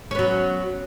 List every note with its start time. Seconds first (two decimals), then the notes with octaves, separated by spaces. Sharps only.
0.11 C#4
0.15 B3
0.19 F#3